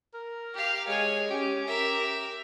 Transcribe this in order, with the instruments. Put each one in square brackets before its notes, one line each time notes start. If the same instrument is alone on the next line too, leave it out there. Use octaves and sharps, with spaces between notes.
[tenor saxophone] A#4
[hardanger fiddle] G4 F5
[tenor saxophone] G#3 [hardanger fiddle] C#5 G#5
[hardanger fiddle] C#4 [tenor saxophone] G4
[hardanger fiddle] A#4 E5